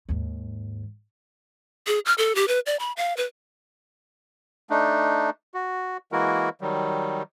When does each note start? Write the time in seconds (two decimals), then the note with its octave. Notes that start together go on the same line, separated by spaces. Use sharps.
0.09 D#2 G#2
1.87 G#4
2.06 F6
2.18 A4
2.35 G4
2.48 B4
2.66 D5
2.80 B5
2.97 F5
3.17 B4
4.70 A3 D4 D#4
5.54 F#4
6.12 E3 G#3 A#3 E4 F#4 A#4
6.61 D#3 F#3 G3